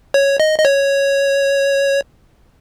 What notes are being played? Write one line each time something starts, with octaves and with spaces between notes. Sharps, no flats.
C#5
D#5
D#5
C#5